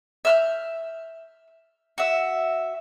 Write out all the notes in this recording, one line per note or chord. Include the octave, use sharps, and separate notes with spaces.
E5 F6 G6
F#4 E5